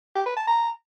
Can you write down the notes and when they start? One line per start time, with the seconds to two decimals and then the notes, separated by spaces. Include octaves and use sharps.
0.16 G4
0.26 B4
0.37 A5
0.47 A#5